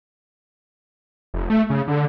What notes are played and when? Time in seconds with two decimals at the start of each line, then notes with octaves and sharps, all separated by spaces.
1.34 F1
1.50 A3
1.70 C#3
1.88 D3